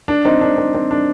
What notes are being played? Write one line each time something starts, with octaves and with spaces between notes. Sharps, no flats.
D4
C4 D#4
D4
C4
C4
D4